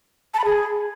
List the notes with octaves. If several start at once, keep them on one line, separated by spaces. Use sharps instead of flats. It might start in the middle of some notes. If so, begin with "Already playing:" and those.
A5
B5
G#4